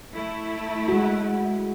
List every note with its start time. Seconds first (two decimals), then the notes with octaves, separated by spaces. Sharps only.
0.14 A3 E4
0.88 G#3 F#4